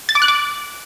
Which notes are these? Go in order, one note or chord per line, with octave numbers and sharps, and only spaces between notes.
A6
D6
F#6
D6